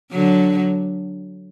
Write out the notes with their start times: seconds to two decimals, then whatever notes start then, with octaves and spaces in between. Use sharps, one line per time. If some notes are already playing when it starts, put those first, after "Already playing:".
0.12 D3 F#3